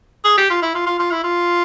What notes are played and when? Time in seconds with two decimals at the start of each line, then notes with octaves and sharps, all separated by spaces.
0.24 G#4
0.37 G4
0.50 F4
0.62 E4
0.75 F4
0.86 F4
0.99 F4
1.11 E4
1.24 F4